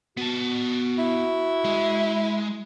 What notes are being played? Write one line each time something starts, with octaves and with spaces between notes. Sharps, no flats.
B3 F#4 A5
E4
G#3